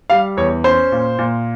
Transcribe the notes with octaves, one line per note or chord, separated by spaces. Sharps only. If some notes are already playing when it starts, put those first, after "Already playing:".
G3 F5
E2 C#5
C#4 C5
A#2
A#2